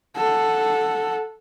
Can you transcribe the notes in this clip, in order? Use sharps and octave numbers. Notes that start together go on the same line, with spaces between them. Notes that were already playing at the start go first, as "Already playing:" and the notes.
A4 F#5